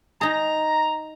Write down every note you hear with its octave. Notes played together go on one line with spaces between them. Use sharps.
D#4 G#4 A#5